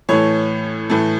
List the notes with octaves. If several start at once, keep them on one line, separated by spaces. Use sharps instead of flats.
A2 E3 A3 C#5
A2 E3 A3